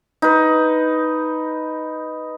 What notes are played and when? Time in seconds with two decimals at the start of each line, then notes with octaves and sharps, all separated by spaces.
0.22 D#4 B4